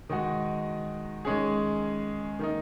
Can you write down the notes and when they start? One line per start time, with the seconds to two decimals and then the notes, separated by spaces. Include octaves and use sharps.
0.09 D#3 G#3 D#4 F#4
1.25 D#3 G#3 C#4 G#4
2.39 D#3 A#3 D#4